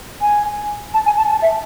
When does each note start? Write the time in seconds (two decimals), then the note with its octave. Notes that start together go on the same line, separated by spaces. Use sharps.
0.22 G#5
0.94 A5
1.06 G#5
1.18 A5
1.31 A5
1.42 E5